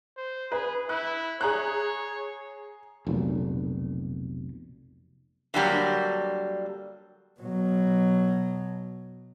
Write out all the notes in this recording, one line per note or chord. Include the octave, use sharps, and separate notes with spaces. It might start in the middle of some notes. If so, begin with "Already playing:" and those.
C5
G#4 B4
E4 F#6
G#4 C#5 A#5 F#6
F1 B1 A#2
D3 F#3 G3 A#3
B2 F#3